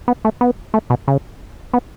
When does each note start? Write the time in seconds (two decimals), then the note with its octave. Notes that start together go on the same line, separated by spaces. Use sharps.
0.08 B3
0.25 A3
0.41 B3
0.74 A3
0.90 B2
1.08 C#3
1.73 B3